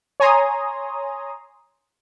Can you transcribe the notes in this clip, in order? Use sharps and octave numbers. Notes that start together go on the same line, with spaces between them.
C#5 G#5 A#5 C6 D#6